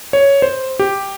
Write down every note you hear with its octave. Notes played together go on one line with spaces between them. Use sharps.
C#5
C5
G4